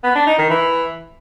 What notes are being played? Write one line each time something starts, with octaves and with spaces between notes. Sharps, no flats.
B3
D4
D#4
D#3
E3